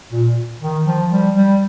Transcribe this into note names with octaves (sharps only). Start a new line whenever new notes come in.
A#2
D#3
F3
G3
G3